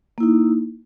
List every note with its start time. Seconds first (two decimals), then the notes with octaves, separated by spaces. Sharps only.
0.18 A#3
0.20 E4
0.23 D#4